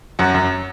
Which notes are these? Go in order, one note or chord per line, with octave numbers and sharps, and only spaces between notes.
F#2 F#4
F#2